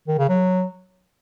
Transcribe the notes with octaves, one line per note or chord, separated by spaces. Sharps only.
D#3
C#3
F#3